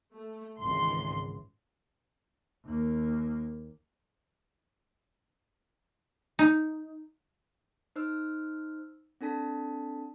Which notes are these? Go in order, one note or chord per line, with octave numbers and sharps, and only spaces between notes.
A3
G#1 C#2 E3 C6
D#2 A#3
D#4
D#4 C5 E6 F6
C4 D4 A4 A5 B6